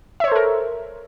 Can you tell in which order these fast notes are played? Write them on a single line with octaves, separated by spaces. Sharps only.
E5 C#5 C5 A4 A#4